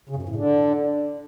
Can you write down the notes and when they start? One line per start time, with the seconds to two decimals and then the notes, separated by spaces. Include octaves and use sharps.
0.09 C#3
0.16 F#2
0.22 F2
0.29 A2
0.36 D3